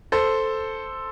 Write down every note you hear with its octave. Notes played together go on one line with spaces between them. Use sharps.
A4 C5